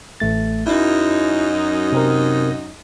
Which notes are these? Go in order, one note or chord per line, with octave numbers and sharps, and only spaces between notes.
A1 A3 A6
F#2 D#4 E4
C3 C4 A#4